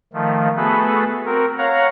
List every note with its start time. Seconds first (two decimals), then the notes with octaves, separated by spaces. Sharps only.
0.14 D#3 F3 A3
0.57 A3 B3 F#4 G#4 A4 B4
1.26 C4 F#4 A#4
1.58 C#5 F5 F#5 A#5